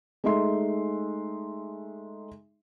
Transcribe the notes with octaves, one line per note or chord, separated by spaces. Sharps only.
G#3 A3 D#4 E5 C6